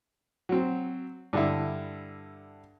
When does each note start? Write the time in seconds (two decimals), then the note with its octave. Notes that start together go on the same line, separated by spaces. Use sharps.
0.49 F#3 C4
1.33 G2 D3 E4